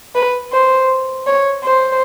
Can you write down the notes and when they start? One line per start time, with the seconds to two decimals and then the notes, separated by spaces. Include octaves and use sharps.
0.15 B4
0.53 C5
1.27 C#5
1.64 C5